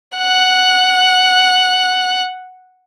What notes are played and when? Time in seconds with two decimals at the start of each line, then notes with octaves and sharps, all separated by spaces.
0.18 F#5 F#6